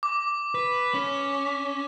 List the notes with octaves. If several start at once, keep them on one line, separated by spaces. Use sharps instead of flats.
D6
B4
C#4